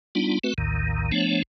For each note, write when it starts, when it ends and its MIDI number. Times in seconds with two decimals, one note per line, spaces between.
0.15 0.39 55
0.15 0.39 59
0.15 0.39 62
0.15 0.39 63
0.15 0.39 65
0.44 0.54 57
0.44 0.54 60
0.44 0.54 66
0.44 0.54 71
0.58 1.11 34
0.58 1.11 39
0.58 1.11 45
0.58 1.11 51
1.12 1.42 53
1.12 1.42 57
1.12 1.42 59
1.12 1.42 62
1.12 1.42 73